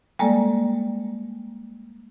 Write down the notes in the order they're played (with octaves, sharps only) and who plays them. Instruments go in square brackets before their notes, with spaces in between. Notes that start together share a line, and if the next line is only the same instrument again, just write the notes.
[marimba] G3 G#3 A#3 A4 D5